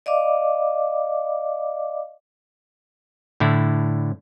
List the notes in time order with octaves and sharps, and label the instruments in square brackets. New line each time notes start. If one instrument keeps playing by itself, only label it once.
[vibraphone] D5 D#5 F5 D6
[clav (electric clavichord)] A2 D3 E4